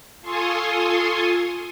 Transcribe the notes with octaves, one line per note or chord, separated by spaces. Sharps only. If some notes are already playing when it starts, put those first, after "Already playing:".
F4 A4 G#5 C6 C#6 D#6